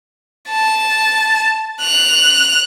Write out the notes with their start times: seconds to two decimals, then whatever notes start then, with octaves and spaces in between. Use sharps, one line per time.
0.49 A5
1.81 F#6 F7